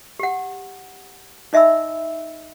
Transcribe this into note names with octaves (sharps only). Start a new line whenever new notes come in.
G4 F#5
D#4 D#5 E5 G#5 B5 E6